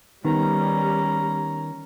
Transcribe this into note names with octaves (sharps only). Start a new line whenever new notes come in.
D#3 G3 B3 C#4 A#5